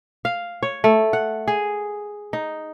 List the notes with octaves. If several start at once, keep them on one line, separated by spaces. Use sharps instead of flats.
F5
C#5
A3
F#5
G#4
D#4